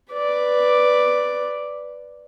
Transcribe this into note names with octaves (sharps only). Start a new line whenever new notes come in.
B4 D5